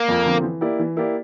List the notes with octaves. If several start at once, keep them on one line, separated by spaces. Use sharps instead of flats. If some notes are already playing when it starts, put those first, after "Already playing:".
Already playing: A#3
F2
D3 F3 C4
E3
A#3 E4 G4 D5
E3
A#3 E4 G4 D5